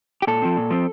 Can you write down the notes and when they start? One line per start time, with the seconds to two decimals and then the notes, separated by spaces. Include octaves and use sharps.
0.22 G4
0.27 A#2 A4
0.42 F3 C4
0.57 A#2
0.70 F3 C4